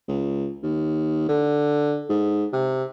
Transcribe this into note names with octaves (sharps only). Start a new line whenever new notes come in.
C#2
D#2
D3
G#2
C3